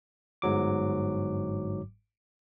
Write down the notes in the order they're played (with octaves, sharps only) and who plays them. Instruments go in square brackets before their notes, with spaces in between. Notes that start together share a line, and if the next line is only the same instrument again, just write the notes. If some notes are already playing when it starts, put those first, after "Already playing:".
[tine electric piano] G1 G#2 F#3 D6